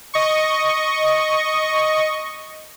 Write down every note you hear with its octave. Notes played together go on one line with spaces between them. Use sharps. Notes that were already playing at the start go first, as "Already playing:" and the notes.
D#5 C#6